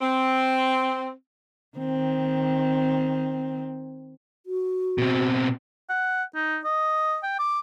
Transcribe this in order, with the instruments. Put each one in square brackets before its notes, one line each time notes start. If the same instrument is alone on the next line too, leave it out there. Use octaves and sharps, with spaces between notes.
[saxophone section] C4
[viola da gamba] D#3 C4
[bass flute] F#4
[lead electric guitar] B2 C4
[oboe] F#5
D#4
D#5
G5
D6